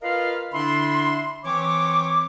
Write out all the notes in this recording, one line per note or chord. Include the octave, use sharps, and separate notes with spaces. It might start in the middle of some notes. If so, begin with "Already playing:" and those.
F4 A#4 B4 D#5 F5
D3 D4 E4 E5 B5 C6
E3 C4 C#5 C#6 D6